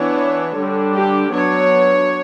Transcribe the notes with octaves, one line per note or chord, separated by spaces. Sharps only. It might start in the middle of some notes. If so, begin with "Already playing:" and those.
Already playing: E3 B3 D4 C#5
D3 G3 D4
G4
F#3 B3 D4 C#5